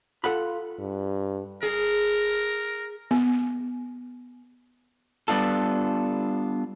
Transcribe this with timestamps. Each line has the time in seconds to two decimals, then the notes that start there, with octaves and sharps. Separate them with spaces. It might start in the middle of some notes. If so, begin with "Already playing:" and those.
0.24 F4 A4 F#5 B5
0.79 G2
1.63 G#4 A#4
3.11 B3
5.28 G3 B3 D4 F4 A4